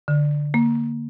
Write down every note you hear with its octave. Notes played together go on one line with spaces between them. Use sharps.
D3
A#3